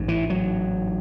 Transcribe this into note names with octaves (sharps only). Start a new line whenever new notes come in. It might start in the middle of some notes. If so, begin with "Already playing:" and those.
Already playing: A1 G#2
E3
F#3